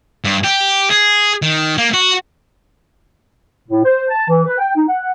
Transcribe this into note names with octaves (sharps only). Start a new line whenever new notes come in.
G2
G4
G#4
D#3
A#3
F#4
A2
C5
A5
E3
B4
G5
D#4
F#5